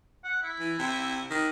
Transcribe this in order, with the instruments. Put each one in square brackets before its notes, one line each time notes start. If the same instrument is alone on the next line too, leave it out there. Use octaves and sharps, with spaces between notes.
[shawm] F#5
E4
[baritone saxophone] E3
C3
D#3